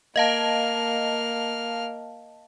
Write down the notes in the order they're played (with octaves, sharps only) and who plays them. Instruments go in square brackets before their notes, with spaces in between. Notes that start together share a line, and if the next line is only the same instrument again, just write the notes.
[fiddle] A#3 F6 [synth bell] D#5 F5 A5